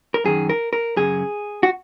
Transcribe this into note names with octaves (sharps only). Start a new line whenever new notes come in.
A#4
F#2 D#3 G#4
A#4
A#4
F#2 C#3 G#4
F#4